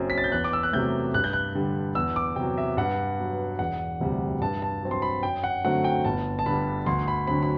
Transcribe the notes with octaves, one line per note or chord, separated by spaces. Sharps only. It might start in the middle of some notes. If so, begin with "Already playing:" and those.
Already playing: F#1 F#2 F#3 C4
B6
A6
G6
E2 F#6
D6
E6
F#6
C3 F#3 A3 G6
G2 F#6
G6
F#6
D3 G3
E2 E6
D6
C3 F#3 G5
E5
G2 F#5
F#3 B3
E1 F#5
D2 C3 G3
G2 A5
A5
F#3 C4
C6
B5
F#2 G5
F#5
D3 F#3 A3 C4 F#5
G5
G1 A5
A5
G2 D3 G3 B5
D2 C6
B5
D3 F#3 C4 B5
B5